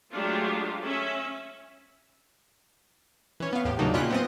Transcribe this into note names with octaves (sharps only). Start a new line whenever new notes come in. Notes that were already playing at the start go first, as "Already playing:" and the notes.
F#3 G#3 A3 D4 F4 G4
C#4 E5
E3 C#4
B3 F5
E2 A2 G4
C#3 F#3 A#3 D4 D#4
A#2 C#4 E4 F4 G5 F#6
B3 C4 D#5